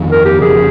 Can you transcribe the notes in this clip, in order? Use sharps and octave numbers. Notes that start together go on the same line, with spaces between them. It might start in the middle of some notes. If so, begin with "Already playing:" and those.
Already playing: G1 F2 D#3
A#4
G4
F1 F2 C#3 G#4